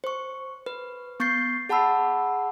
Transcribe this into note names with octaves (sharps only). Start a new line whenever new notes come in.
C5 C#6
B4
B3 C#6 G6 A6 C7
G#4 F#5 A5 B5 E6